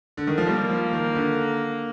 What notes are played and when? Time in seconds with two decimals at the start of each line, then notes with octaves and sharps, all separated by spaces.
0.17 D3
0.27 D#3
0.38 F3
0.47 G3 A#3
0.69 F3
0.93 D#3
1.15 D3